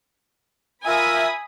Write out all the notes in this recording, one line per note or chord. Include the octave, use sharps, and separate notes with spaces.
F4 A#4 E5 G#5 B5 D#6